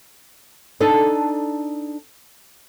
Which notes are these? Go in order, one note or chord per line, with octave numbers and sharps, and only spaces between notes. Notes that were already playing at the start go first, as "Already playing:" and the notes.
D4 D#4 A4